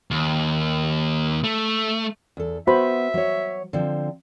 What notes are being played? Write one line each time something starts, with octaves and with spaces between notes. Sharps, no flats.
D#2
A3
E2 A4
B3 F#4 C5 E5 B5
F#3 C#5
D3 F3 C4